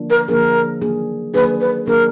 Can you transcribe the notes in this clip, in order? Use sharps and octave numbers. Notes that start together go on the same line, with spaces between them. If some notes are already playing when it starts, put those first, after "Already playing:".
Already playing: D3 F3 A#3 D4
A#4
D3 F3 A#3 D4 G#4 A#4
D#3 F#3 A#3 D4 G#4
D#3 F#3 A#3 D4 G#4 B4
B4
D#3 F#3 A#3 D4 G#4 A#4